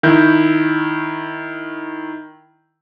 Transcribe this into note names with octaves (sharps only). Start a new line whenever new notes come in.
D#3 E4 G6